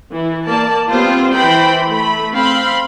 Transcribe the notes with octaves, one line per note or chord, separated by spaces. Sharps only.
E3
A#3 D5 A5
G3 B3 C4 F4 C5
E3 C5 G5 B5
A3 B5
C4 F5 B5 C6